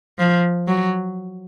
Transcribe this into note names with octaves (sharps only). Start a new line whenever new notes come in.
F3
F#3